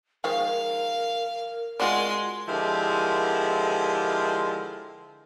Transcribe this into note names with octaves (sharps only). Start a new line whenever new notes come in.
D#3 F3 G#3 A#4 F5
G#3 F4 F#4 D5 C6
D3 F3 G#3 E4 G4 A#4